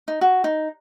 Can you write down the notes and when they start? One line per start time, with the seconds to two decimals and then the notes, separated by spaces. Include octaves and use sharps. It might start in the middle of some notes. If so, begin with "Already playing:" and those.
0.08 D#4
0.21 F#4
0.44 D#4